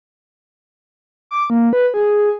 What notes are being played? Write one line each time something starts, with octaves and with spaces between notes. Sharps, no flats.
D6
A#3
B4
G#4